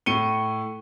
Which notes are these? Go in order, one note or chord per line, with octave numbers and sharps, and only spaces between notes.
A2 C#7 D#7 G7